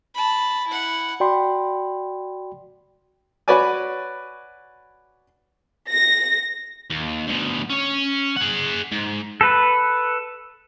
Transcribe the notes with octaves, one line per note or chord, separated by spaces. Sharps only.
A5 B5
E4 F#5
F#4 D5 G5 B5 C6
F#4 B4 C#5 D5 G#5
A#6
D#2
D2 B2
C#4 C#5
G#4 F#5
G#2
A4 B4